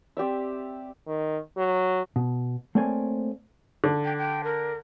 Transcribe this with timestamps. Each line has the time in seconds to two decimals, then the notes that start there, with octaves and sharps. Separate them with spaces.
0.17 C4 G4 D5 E5
1.08 D#3
1.57 F#3
2.16 B2
2.75 A3 A#3 C4 C#5 D5 G#5
3.84 D3
4.05 G5
4.18 G5
4.44 A#4